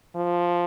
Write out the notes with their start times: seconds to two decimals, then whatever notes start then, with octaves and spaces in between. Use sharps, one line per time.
0.15 F3